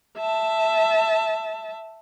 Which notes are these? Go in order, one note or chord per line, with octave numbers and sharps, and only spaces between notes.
E5 A5